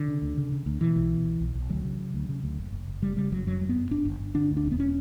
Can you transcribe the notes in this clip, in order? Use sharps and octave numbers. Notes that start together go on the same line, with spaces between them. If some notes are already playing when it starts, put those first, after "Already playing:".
Already playing: D3
C#3
D2
C#3
C#3
D2
B2 E3
B1
B2
B1
B1
B1
D2 F#3
C#3
C#3
D2
C#3
D2
F#1
F#1
F#1
C#3 G3
C#3 G3
F#1 F#3
F#2 F#3
F#2
B3
F#2
G1 D4
G1
G1
D3 D4
D2
D4
E1
B3
C#4